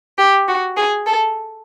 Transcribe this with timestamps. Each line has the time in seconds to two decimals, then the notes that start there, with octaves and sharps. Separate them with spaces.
0.18 G4
0.48 F#4
0.77 G#4
1.07 A4